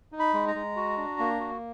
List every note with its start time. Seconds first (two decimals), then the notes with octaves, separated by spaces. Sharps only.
0.12 D#4
0.19 B5
0.34 G#3
0.48 A#5
0.55 G#3
0.76 F#4
0.97 D4
1.19 A#3
1.40 F#4